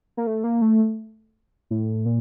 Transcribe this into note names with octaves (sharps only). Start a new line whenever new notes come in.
A#3
A3
A#3
A3
A2
A#2